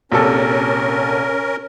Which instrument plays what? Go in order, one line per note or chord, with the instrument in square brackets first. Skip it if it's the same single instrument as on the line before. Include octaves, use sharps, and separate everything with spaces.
[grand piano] A#1 C3 A4 [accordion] C#4 A#4